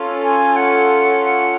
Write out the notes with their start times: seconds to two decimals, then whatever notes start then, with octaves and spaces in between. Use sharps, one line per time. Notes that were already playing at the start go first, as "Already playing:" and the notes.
Already playing: C#4 F4 A4
0.22 G#5
0.56 F#5
1.25 F#5